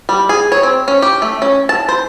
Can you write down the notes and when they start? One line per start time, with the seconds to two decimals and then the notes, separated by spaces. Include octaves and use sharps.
0.09 G3
0.29 G#4
0.52 C#5
0.63 C4
0.88 C#4
1.02 G4
1.22 A3
1.42 C#4
1.69 A5
1.89 C5